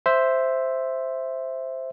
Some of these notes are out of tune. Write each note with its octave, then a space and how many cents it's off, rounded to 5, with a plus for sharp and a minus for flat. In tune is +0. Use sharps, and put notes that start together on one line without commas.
C5 +0 E5 +0